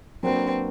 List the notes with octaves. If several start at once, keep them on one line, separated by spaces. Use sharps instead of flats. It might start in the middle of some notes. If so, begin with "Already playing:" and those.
F#3 A#3 C4 D4 F#4 B4